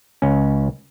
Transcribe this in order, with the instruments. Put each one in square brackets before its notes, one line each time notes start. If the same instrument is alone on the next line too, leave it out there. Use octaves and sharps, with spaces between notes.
[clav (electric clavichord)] C#2 C#4